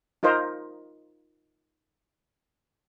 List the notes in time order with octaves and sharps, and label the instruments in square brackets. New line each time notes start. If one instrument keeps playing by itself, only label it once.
[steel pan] D#4 F4 A#4 C5 D#5